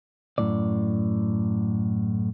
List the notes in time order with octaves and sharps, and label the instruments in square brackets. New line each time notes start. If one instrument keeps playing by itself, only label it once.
[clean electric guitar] F#2 A2 D5